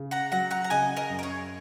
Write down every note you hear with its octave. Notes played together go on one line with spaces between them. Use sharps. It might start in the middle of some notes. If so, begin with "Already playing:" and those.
Already playing: C#3
F#5 A#5
F#3 F#5 A#5
F#5 A#5
A#5
C#3 D#5 G#5
A#4 D#5
F#2
A#4
G#4 C#5